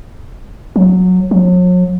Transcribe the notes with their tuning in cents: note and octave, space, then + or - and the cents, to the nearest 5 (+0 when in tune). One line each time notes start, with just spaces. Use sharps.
F#3 -15
F#3 -40